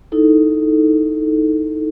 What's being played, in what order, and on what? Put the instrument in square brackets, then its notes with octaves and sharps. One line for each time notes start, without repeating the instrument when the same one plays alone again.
[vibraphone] D#4 E4 A4